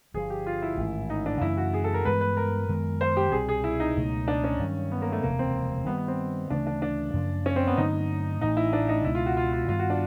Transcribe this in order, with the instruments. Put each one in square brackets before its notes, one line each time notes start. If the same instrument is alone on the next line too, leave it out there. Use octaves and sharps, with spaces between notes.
[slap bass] G1 G2 D3 F3 [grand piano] G#4
[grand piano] G4
F4
E4
[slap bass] A1 G#2 D#3
[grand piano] D#4
D4
[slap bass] F#2 C#3 E3 A3 [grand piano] E4
[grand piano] F#4
G#4
A4
A#4
[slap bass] G2 E3 G#3 B3 [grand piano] B4
[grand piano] B4
A#4
[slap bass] F#2 D#3 G#3 B3
[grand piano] C5
G4
[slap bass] C2 B2 G3 C4 [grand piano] G#4
[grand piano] G#4
E4
D#4
[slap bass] C#2 B2 F#3 A3
[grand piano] D4
C#4
[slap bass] G2 D#3 F#3
[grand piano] B3
A#3
A3
[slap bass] E1 D2 C3 F3 [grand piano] A#3
[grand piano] C4
[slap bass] G2 D#3 G3 [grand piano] B3
[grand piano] B3
C4
[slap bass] D2 C#3 E3 A3 [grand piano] D4
[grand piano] D4
D4
[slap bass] F#2 C#3 F3 A#3
[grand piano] C#4
C4
B3
[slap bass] G2 D3 F#3 A3 [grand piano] D#4
[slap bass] A1 A2 E3 [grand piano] D#4
[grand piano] E4
D4
D#4
[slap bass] C#2 B2 G#3 [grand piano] E4
[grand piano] F4
F#4
F4
F4
[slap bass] G2 D#3 G3 B3 [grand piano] F4
[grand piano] F#4
D4